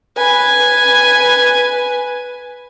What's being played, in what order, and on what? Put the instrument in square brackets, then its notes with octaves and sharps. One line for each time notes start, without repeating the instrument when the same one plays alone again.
[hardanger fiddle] B4 G#5